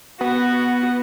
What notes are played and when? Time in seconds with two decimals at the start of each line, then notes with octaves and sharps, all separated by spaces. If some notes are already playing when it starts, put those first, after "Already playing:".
0.21 B3 F#4